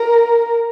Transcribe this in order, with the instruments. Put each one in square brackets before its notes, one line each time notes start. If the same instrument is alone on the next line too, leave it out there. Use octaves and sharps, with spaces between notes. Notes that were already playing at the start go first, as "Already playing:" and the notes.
Already playing: [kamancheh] A#4